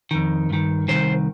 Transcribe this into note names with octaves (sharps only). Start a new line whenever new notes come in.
F2 D#3
G2 D#3
C2 C3 D#3 C5